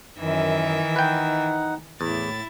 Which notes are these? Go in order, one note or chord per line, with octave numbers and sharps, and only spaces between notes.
F#2 D#3 E3 E5
D#4 B4 F#5 G5
E2 A2 E4 A6